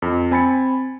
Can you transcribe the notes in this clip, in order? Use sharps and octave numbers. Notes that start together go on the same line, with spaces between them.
F2
C4 G#5 B5 A6 C#7